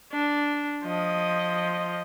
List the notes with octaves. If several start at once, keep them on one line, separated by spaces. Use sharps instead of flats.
D4
F3 D#5